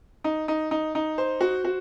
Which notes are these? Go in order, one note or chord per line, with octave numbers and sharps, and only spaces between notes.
D#4
D#4
D#4
D#4
C5
F#4
F#4